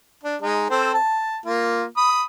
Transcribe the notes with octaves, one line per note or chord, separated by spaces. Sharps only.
D4
G#3 D#4
C4 A4 C5
A5
A#3 F4
B5 D#6